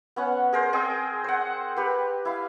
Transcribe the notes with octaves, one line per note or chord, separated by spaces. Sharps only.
B3 C#4 F#5
G#4 A#4 C5
C4 G#4 D#5 G5
C5 F#5
G4 B4
E4 F5